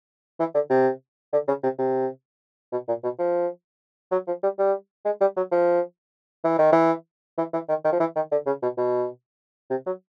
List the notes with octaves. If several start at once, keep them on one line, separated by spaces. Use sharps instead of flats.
E3
D3
C3
D3
C#3
C3
C3
B2
A#2
B2
F3
F#3
F3
G3
G3
G#3
G3
F#3
F3
E3
D#3
E3
E3
E3
D#3
D#3
F3
E3
D#3
D3
C#3
B2
B2
C3
F#3